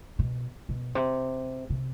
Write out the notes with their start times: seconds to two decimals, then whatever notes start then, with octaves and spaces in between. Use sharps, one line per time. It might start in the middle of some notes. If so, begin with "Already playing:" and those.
0.19 B2
0.69 B2
0.95 C3
1.70 C3